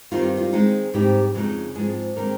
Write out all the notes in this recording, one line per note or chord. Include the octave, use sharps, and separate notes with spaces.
G2 D#3 G3 C4 D#4 F4
F4
D#3 G#3 C4 D#4
G#2 G3 C4 D#4 G4
F2 C#3 G#3 C4 D#4
G#2 F3 G#3 C4 G#4
D#3 G#3 A#3 C4 D#4 A#4